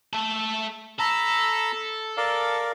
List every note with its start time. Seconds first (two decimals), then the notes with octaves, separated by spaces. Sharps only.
0.13 A3 A4
0.99 A4 A#5 B5 E6
2.17 A#4 D5 F5